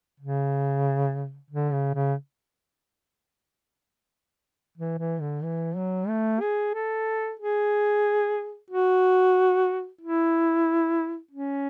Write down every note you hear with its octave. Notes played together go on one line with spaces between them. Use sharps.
C#3
D3
C#3
C#3
E3
E3
D3
E3
F#3
A3
G#4
A4
G#4
F#4
E4
C#4